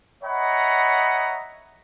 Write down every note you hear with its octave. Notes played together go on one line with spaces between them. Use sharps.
C#5 D#5 E5 F#5 A#5 B5